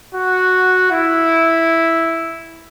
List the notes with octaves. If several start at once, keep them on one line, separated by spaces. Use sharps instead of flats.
F#4
E4